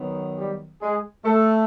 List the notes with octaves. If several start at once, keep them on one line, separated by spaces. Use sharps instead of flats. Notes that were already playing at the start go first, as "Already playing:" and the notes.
Already playing: D#3 F#3 B3
G3 G4
G#3 G#4
A3 A4